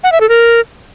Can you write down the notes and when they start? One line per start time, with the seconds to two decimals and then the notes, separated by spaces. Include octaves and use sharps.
0.04 F#5
0.12 E5
0.21 A4
0.29 A#4